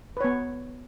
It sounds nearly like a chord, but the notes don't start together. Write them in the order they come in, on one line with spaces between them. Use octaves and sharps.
B4 C#5 B3